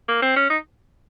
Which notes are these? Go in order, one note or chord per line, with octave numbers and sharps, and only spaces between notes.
A#3
C4
C#4
D#4